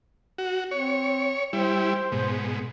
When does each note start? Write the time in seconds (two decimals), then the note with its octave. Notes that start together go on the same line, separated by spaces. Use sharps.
0.38 F#4
0.71 C4 C#5
1.53 G3 E4 C5
2.12 G#2 B2